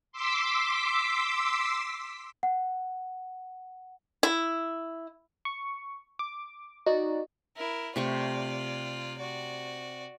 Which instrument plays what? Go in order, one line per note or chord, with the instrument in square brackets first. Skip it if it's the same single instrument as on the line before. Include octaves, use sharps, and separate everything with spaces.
[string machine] C6 D6 E6 B6
[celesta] F#5
[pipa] E4
[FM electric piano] C#6
D6
[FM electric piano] D#4 [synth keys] F#4 D5
[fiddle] E4 A#4
[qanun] C3 A3 C#6 [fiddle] F4 D5
[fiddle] F#4 D5